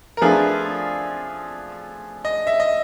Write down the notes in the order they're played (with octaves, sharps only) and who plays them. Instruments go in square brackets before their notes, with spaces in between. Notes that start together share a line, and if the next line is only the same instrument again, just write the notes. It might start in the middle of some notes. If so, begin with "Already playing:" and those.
[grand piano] A#4
[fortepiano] F3 A3 D4 F4 G#4 [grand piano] B4
[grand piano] D#5
E5
D#5